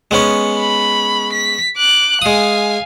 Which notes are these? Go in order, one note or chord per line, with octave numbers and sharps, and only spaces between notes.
G#3 B3 C#4
B5
B6
D6 F#6
G#3 F5 G#5 D#6